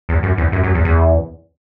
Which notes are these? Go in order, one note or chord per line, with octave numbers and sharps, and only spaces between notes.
E2
F#2
E2
F#2
F#2
E2
E2